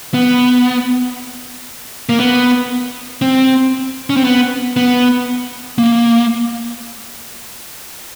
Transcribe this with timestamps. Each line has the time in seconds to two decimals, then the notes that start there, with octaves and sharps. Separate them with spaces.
0.14 B3
2.09 A#3
2.20 B3
3.22 C4
4.10 C#4
4.17 C4
4.24 B3
4.77 B3
5.78 A#3